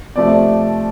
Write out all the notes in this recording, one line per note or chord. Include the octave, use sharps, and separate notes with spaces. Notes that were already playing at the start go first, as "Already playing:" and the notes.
C3 F3 A3 D5